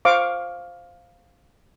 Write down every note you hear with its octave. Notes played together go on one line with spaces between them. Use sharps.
C5 F5 C#6 D6